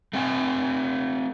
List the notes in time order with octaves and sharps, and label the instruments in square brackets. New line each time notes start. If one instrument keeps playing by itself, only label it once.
[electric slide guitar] A3 C4 F#5 G#5